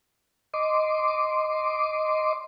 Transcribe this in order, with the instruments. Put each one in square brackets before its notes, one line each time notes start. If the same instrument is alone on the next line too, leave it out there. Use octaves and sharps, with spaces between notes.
[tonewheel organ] D#5 C6 D6